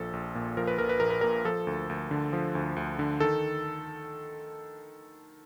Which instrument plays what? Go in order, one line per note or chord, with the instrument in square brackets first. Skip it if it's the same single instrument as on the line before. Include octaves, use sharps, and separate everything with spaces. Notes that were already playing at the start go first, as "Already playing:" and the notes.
Already playing: [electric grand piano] A#1 F3 A4
A#1
A#2
F3 A#4
B4
A#1 A#4
B4
A#1 A#4
B4
A#2 A#4
F3 A4
D2
D2
D3
F3
D2
D2
D3
D#3 A4